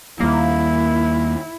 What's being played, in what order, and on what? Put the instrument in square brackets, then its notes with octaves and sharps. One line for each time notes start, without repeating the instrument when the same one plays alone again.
[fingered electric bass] D#2 G3 [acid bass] A#3 [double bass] E4